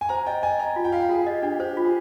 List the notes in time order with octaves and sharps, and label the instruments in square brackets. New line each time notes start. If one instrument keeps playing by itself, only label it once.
[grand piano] G#5
[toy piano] C5 [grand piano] A#5
[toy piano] D#5 [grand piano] G5
[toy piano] D#5 [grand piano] G#5
[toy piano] D#5 [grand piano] A#5
[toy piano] F4
[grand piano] G5
[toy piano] F4 [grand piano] F5
[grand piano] G5
[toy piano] F4 [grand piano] G#4
[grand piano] G4 [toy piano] D#5
[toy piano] D4 [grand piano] G4
[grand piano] G4 [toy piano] C5
[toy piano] F4
[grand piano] G#4